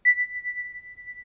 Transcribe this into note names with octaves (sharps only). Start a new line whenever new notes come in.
B6